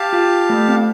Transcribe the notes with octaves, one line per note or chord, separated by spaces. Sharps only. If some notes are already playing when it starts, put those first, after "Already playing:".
Already playing: G4 F5 A5
F4
A3
C4